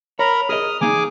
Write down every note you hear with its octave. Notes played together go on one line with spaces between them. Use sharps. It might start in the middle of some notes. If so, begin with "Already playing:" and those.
A#4 C#5 A#5 B5
G#4 A#4 D#5 D#6 F6
E3 A#3 D#4 G#4 G#5 D6